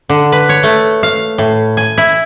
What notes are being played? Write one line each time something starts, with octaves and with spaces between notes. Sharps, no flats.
D3
B4
C#5
A3
F5
A2
G#5
E4